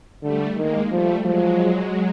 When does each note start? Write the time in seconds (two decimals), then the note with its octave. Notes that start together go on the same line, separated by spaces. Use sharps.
0.22 D3 G3 A3
0.57 D#3 G#3 A#3
0.91 F3 G3 A3
1.25 F3 F#3 G#3